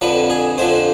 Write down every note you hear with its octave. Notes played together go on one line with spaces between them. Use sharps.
F2 D3 F3 B4
G#4
F2 D3 F3 C5